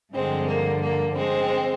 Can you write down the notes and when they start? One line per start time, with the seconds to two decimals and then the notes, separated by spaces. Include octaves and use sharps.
0.13 G2 D3 F3 G#3 C4
0.48 A#3
0.81 A#3
1.15 G#3 C4